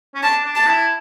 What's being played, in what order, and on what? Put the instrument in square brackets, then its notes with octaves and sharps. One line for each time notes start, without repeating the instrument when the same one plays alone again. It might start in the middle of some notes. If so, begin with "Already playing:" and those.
[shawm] C#4
[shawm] D4 [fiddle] A5
[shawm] D4
[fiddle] A5
[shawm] E4